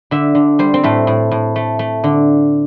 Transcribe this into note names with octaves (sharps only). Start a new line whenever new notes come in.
D3 E5
D3
G3 C5
C4
A2 A3
A2
A2
A3
A3
D3